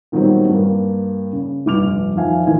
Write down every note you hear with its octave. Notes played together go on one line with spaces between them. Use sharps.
A#2 D#3 F#3 G3 B3 C4
G2 A#3
C#3
F1 A#1 G2 D6 F6 F7
F2 D#3 F3 E5 F5 G#5
E1 A1 D#2 E3 A#3 G#5